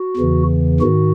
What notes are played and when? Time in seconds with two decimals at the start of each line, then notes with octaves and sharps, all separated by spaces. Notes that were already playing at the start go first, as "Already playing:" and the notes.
Already playing: F#4
0.17 E2 C#3 E3
0.80 G#2 D#3 F#4